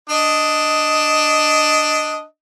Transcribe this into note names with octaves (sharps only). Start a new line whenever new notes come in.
D4 D#5